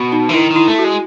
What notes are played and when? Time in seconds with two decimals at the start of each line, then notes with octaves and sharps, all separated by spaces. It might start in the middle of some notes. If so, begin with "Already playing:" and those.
Already playing: B2
0.12 D#4
0.29 E3
0.34 D#3 E4
0.50 D#3
0.56 E4
0.68 A3
0.79 F#4
0.84 G#3